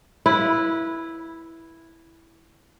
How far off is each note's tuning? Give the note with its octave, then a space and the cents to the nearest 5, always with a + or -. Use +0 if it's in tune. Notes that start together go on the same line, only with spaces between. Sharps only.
E4 +0 B4 -20 F5 +0